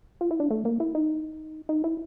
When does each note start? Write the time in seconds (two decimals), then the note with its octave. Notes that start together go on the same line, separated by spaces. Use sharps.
0.21 F4
0.31 E4
0.40 D4
0.51 A3
0.65 A#3
0.80 E4
0.95 D#4
1.69 D#4
1.84 E4